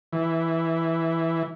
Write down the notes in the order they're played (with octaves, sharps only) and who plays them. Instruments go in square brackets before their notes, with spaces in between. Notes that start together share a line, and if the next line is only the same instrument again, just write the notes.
[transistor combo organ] E3